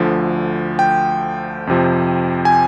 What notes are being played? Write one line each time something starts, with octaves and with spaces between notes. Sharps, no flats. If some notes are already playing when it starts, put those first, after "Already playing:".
Already playing: D2 D3 F3
G5
F2 C3 F3
G#5